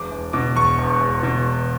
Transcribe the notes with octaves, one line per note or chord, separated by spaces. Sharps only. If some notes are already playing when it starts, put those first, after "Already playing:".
Already playing: E1 D6
E1
B2 D6
E2 C#6
E1
E1
B2